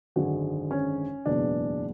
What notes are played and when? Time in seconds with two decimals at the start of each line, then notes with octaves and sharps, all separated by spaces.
0.16 G#1 F#2 D3 G#3 F#4
0.71 C#4
1.26 F#1 E2 B2 G#3 D4